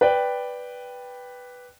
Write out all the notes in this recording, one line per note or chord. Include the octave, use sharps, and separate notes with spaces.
B4 D5 G5